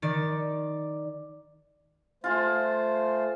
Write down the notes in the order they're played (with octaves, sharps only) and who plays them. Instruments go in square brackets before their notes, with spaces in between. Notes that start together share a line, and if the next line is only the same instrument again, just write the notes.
[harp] D#3 D5
[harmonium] A3 C5 [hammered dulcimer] F4 G#4